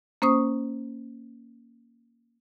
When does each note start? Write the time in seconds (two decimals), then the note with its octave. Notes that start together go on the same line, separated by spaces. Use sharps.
0.22 A#3 C#4 C5 C#6 D#6